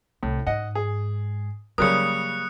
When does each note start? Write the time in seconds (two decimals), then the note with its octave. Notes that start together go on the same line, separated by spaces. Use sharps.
0.23 C2 A2
0.47 G#2 D#5 F#5
0.75 G#4
1.78 C#3 F#3 G3 A#3 A#4 D#6 F#6 C#7